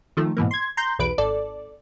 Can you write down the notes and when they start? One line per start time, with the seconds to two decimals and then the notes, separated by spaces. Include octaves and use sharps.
0.17 D#3 F3 A3
0.37 G#2 B2 E3 A#3
0.51 C6 G#6
0.77 A#5 C6 G6
0.99 B1 E2 B4 D7
1.18 G#1 A4 D5